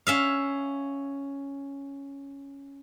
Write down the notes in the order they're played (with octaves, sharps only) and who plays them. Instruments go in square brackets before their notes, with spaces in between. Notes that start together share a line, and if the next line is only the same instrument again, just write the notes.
[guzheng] C#4 E5 F5